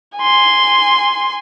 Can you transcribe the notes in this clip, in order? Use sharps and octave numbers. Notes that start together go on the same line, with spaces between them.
G#5 C6